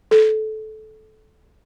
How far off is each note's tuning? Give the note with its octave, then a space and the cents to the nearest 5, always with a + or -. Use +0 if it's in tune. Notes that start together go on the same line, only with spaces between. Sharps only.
A4 -20